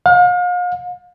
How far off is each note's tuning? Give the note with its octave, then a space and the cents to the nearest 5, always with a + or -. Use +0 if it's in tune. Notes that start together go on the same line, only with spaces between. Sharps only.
F5 +40